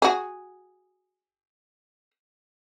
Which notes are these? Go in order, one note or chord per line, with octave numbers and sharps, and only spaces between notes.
F#4 G#4